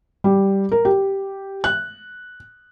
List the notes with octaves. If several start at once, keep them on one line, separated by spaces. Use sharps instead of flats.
G3
A#4
G4
F#6